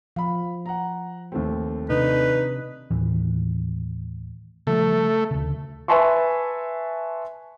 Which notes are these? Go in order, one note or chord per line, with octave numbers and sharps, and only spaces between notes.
F3 F5 B5
F#5 A#5
D#2 A3 C4
C3 D4 D#4 B4
D#2 A2 E3
C#3 F3 G3 A3
D2 C#3
B4 E5 G#5 A5 C6 C#6